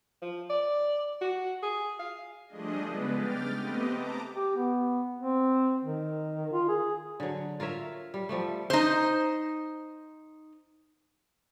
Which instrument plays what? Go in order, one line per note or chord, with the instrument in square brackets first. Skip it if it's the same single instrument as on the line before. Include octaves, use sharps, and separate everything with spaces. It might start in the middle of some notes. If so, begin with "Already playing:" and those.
[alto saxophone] F3
D5
F#4
G#4
F5
[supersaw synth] F3 G3 A3 D4 G#4 D#5
C#3 G#3 B3 D4 B4
G5 D6 F6 A6
A3 B3 C4 G4 B4 D#5
A5 A#5 D6
[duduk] G4
B3
C4
D#3
F4
G#4
[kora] D3 F#3
F4 A#4 C#5 E5
G3
F3 G3 A3
[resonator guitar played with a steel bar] D#4 C5